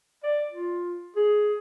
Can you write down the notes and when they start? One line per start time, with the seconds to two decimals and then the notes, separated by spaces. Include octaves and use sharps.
0.23 D5
0.51 F4
1.16 G#4